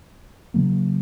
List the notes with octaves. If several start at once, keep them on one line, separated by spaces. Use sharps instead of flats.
C#3 F#3 A#3